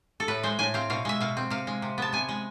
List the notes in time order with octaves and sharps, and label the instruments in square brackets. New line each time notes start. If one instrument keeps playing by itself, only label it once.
[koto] A4
A2 B4
G#3 C5
A2 G#5
C4 F5
B2 F5
G#3 E5
B2 F5
C4
C3 F5
G#3
C3
B3 A5
C3 G#5
G#3